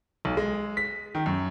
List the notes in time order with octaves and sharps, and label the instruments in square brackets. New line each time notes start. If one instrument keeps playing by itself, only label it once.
[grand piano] B1
G#3
B6
D#3
F#2